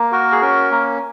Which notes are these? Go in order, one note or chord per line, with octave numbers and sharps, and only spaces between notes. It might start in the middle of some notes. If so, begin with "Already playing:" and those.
Already playing: A#3
F#4 A#4
G#4
C#4 A#4
A#3